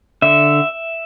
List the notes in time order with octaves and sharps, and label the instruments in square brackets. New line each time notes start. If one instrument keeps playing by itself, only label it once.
[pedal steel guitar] D3 E5